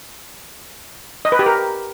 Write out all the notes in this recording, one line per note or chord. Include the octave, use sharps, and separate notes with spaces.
D#5
B4
G4
A#4